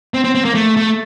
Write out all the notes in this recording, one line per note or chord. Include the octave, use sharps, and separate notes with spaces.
C4
C4
C4
A#3
A3
A3